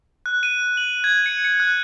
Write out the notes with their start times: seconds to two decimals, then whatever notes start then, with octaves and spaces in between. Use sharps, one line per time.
0.26 F#6
0.43 D#7
0.77 F#7
1.04 G#6
1.26 C#7
1.44 C#7
1.60 F#6